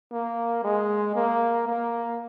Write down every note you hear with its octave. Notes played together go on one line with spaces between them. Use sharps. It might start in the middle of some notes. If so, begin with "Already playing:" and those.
A#3
G#3
A#3
A#3